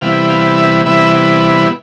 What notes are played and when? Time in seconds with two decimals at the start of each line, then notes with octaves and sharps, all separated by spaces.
0.01 C3 E3 G3 B3 E4 F5
0.29 F5
0.57 E5
0.85 C3 E3 G3 B3 E4 E5